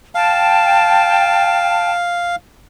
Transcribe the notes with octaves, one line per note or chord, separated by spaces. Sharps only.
F5 G5 A5